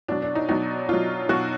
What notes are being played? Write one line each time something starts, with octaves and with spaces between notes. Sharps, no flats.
B2 F#3 D4
D4
D#4
B2 F#3 D#4
B2 F#3 F4
B2 F#3 F#4